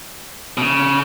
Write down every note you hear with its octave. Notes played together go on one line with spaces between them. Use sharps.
B2
C#3